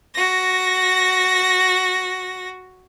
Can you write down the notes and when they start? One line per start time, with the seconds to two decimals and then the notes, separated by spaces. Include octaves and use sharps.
0.13 F#4 A#6